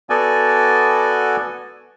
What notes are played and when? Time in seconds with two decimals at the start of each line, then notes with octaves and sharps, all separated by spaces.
0.10 B3 F#4 A4 D5 G#5